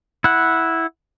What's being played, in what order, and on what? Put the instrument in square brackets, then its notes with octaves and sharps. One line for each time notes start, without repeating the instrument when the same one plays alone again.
[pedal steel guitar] E4 F#5